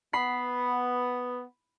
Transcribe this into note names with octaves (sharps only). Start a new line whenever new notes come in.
B3 B5 C7